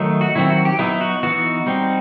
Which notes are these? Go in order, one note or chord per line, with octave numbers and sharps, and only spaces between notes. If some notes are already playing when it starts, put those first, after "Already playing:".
Already playing: D#3 F#3 A3 D#4
F#4
D#3 F#3 C4 E4
F#4
G4
F#3 B3 D#4 E4
F#4
E3 B3 D#4 F#4
G3 C4 D#4